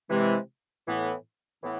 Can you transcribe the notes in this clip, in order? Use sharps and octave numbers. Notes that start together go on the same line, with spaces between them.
C3 E3 G#3
A2 E3 B3
A2 E3 B3